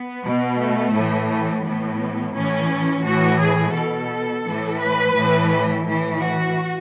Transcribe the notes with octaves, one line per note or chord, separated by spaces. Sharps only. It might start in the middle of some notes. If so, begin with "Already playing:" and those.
Already playing: B3
B2
A3
A2 E3
A3
A2 E3 B3
A2 E3 C#4
A2 E3 F#4
G#4
B2 A4
A2 E3
B4
A2 E3
A2 E3
F#4